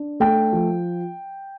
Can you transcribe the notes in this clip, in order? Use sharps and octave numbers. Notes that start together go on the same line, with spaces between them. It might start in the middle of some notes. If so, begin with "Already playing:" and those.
Already playing: D4
A3 G5
F3